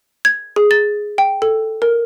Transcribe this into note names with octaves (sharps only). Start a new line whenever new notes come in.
G#6
G#4
A6
G5
A4
A#4